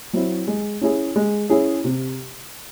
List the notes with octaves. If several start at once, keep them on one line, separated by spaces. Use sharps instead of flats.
F#3 C4 E4
G#3
C#4 E4 G#4
G#3
C#4 E4 G#4
C3